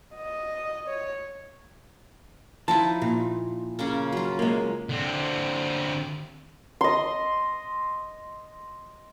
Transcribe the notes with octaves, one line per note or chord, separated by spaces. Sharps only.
D#5
C#5
F3 D#4 E4 A5
A#2
C#3 A#3 C#4
F#3 F4
G#3 A#3
D3 C4
D#5 C6